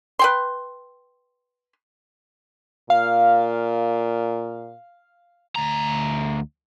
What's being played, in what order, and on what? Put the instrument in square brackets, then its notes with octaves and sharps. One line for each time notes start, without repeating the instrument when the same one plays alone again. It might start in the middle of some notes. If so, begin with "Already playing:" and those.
[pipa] B4 G5 C6
[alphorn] A#2 [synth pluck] F5
[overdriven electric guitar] D2 A#5